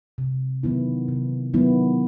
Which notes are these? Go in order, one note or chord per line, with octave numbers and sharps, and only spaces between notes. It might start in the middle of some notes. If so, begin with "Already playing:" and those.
C3
D#3 F#3 B3 E4
C3
D#3 F#3 B3 E4